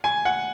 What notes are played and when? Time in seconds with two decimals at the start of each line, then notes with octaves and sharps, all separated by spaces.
0.04 G#5
0.25 F#5